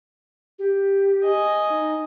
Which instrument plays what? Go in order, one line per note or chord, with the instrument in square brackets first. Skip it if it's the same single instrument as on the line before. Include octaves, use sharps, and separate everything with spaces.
[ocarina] G4
[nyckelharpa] D#5 G#5
[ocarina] D#4